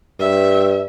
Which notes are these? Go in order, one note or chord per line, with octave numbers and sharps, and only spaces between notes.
G2 E5